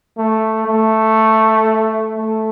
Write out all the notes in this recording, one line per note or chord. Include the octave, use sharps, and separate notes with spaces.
A3
A3
A3